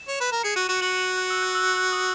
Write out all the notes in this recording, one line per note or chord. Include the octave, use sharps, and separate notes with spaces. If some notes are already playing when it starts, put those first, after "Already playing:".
Already playing: E7
C#5
B4
A#4
G#4 C#7
F#4 D#7
F#4 E7
F#4 F#7
E7
F#6
E6
F#6
E6
D#6